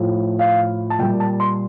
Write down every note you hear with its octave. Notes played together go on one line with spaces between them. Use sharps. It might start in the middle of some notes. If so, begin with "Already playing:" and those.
Already playing: A2 F3
F5
A5
A#2 G3 G5
A5
C6